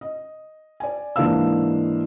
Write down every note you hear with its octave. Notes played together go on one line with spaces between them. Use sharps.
D#5
D5 G#5
G#2 E3 A#3 D4 F5 E6